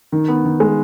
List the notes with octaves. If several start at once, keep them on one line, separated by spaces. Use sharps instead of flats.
D#3
B3
D#3
G#3